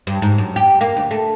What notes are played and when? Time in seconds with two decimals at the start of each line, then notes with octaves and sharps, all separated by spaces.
0.07 G2
0.22 G#2
0.38 F#2
0.56 G4
0.81 A#3
0.96 D2
1.11 A3